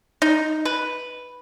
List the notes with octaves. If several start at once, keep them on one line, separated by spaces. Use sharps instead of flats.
D#4
B4